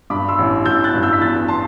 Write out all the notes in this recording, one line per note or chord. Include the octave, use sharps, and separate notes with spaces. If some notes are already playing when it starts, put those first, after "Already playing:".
G2 B5 D6
C6 E6
A1
A1 E6 G6
F#6 A6
G2
E6 G6
B6
E2 F#6 A6
A5 C6